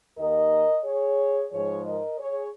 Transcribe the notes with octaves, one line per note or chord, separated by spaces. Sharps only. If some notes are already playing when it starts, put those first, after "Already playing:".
D#2 D#3 A#3 A#4 D#5
G#4 C#5
G#2 F3 G#3 G#4 C#5
A#4 D#5
G#4 C#5